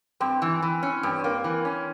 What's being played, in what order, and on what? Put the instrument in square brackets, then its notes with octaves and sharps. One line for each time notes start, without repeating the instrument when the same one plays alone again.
[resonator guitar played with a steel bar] G2 [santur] C4
[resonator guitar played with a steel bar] E3
E3
C#4
G2
A#3
E3
C#4